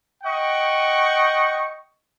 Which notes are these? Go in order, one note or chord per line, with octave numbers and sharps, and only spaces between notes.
D#5 F#5 G5 C#6